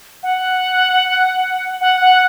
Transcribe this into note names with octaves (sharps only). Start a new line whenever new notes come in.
F#5
F#5
F#5